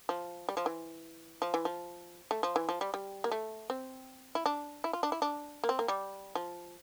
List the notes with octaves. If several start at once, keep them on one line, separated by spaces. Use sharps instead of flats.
F3
G3
F3
E3
F3
E3
F3
A3
F3
E3
F3
G3
G3
A#3
A3
C4
E4
D4
E4
F4
D4
E4
D4
A#3
C4
A#3
G3
F3